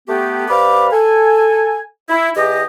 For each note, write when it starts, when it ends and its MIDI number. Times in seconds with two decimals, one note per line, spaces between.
0.08 0.48 57
0.08 0.48 59
0.08 0.48 67
0.49 0.91 48
0.49 0.91 71
0.49 0.91 74
0.49 0.91 77
0.49 0.91 83
0.49 0.91 86
0.92 1.80 69
0.92 1.80 80
2.09 2.29 64
2.36 2.64 40
2.36 2.64 67
2.36 2.64 75